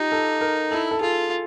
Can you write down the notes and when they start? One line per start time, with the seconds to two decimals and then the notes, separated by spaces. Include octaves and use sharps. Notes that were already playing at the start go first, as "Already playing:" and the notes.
Already playing: D#4 F4 G4
0.12 A4
0.41 A#4
0.71 E4 A4
0.91 A4
1.01 F4 G#4